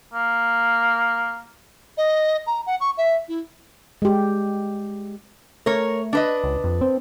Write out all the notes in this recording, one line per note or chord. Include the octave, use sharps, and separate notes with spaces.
A#3
D#5
A#5
F#5
C#6
E5
E4
G#3 G4
A3 A#4 C#5
D4 B4 D#5
C#2
F2
C4